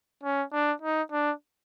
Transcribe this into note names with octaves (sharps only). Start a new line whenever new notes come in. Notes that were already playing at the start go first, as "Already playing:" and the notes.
C#4
D4
D#4
D4